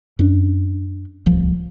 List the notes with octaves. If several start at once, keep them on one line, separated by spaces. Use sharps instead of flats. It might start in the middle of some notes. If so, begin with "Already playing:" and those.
F#2 C#4 D4
D1 C2 F3